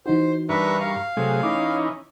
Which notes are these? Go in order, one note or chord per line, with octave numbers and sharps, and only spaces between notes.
E3 D#4 F#4 C5
G2 D4 A#4 B4 E5 C#6
F5
C3 F#3 A3 G#4
E3 C#4 D#4 D6